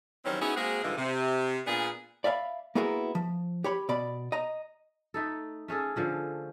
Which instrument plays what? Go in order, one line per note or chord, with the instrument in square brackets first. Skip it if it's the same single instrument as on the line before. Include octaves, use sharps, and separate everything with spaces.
[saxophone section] D#3 E3 F#3 G3 C4 C#4
B3 C#4 D#4 E4 F#4 G#4
G#3 A#3 C4 F#4 G#4
G#2 D3 E3 F3 G3 G#3
C3
A#2 B3 D4 G#4
[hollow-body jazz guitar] D5 E5 F5 G5 B5
A#3 B3 E4 F#4 G#4 A#4
F3
G4 C#5 B5
B2 D5 B5
D#5 A#5
[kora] A3 D#4 A4
A3 C#4 G#4 A4
D3 F3 C#4